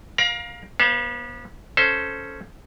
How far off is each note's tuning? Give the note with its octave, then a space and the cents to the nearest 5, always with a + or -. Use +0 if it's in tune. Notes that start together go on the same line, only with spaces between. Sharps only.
A#4 +25 F5 +15 A#5 +45
B3 -35 C5 +25 F5 +0
C#4 +0 A4 +0 C5 +0